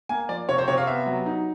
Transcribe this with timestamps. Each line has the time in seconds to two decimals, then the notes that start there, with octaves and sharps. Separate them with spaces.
0.09 A#3 G#5
0.29 F3 D5
0.49 C3 C#5
0.58 C5
0.68 C3 C#5
0.78 F5
0.87 B3 E5
1.06 F#3
1.26 D#4